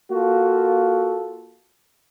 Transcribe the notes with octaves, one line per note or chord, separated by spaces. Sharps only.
A#3 F4 F#4 A4